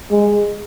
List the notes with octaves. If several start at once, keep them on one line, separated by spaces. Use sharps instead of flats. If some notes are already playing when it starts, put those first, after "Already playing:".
G#3